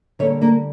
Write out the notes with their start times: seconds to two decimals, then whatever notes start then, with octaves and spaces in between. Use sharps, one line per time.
0.19 D3 G3 A#3 A4 C#5
0.41 A#3 D4